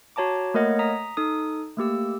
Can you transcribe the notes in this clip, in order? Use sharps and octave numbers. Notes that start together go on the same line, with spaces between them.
F#4 C#5 A5 A#5 D6
A3 A#3 A#4 C#5 D#5 F#5
A#5 D#6 B6
D#4 A4 D#6
A3 A#3 G4 E6